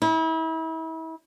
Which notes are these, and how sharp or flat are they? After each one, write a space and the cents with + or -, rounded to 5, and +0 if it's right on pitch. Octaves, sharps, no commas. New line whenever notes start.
E4 -35